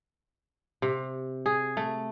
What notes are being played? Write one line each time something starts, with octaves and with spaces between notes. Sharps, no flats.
C3
G#4
A3